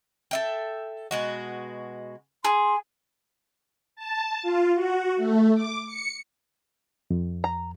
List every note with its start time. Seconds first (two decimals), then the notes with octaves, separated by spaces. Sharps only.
0.31 A4 E5 G5
1.11 B2 G#3 F#4
2.45 G#4 C6
3.96 A5
4.42 F4
4.74 F#4
5.16 A3
5.54 D6
5.86 C#7
7.10 F2
7.44 A#5